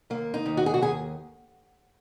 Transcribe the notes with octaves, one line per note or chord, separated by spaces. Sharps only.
D#2 A#3
D#4
D#2
F#4
G#4
F#4
D#2 G#4